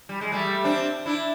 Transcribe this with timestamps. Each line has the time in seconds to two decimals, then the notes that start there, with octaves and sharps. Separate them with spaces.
0.09 G3
0.21 G#3
0.32 G3 A3
0.64 C4 D4
1.06 D4 E4